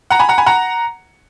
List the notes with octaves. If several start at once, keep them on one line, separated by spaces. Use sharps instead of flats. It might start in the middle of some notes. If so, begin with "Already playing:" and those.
F#5 A#5
G#5 B5
F#5 A#5
G#5 B5
F#5 A#5